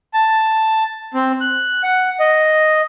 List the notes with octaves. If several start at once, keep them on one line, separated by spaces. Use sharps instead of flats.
A5
C4
F#6
F#5
D#5